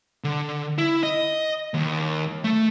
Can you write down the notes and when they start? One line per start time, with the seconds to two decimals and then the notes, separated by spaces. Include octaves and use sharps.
0.24 D3
0.78 E4
1.03 D#5
1.74 D#2
2.44 A3